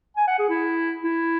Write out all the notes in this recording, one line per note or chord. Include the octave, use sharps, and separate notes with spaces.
G#5
F#5
G#4
E4
E4